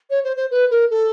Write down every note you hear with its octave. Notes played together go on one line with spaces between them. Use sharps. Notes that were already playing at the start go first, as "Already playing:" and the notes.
C#5
C5
C5
B4
A#4
A4